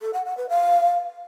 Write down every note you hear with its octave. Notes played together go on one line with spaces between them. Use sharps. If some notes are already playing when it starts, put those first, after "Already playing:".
A4
F#5
F#5
B4
F5